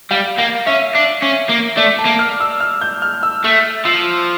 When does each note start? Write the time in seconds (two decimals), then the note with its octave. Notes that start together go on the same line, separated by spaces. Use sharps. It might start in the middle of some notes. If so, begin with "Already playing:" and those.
0.11 G3 F5
0.39 A#3 F5
0.66 C#4 E5
0.95 D4
1.22 C#4
1.49 A#3
1.77 A3 D5
1.98 A5
2.05 A#3
2.19 F6
2.40 E6
2.60 F6
2.81 G6
3.02 F6
3.23 E6
3.44 A3 E6
3.85 F3 E6